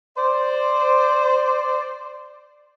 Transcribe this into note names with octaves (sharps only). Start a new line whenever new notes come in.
C5 D5